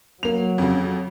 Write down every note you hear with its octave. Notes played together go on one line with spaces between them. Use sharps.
F#3 A#3 F7
F2 C#3